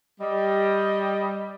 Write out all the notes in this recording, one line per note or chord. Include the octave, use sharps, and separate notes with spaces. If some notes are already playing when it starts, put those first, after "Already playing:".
G3 D#5